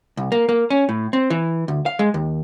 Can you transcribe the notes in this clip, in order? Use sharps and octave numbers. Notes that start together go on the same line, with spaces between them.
C2
A#3
A#3
C#4
A2
C4
E3
D2
F5
G#3
D#2